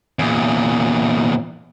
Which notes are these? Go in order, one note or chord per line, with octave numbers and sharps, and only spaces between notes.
E2 A#2